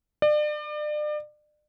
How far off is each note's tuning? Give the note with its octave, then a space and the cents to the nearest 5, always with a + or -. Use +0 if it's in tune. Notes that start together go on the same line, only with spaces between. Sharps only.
D5 +35